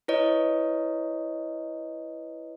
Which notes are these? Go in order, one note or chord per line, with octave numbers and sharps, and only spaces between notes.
E4 B4 C#5 D#5